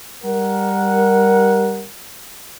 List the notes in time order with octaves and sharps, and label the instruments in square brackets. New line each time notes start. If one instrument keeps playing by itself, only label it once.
[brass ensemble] G3 A#4 F#5